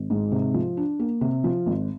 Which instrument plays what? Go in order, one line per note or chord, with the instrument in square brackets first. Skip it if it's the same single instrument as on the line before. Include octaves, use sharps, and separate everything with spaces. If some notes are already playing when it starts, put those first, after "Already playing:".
Already playing: [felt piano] G#1
G#2
C3
F3
D4
A#3
C3
F3
G#1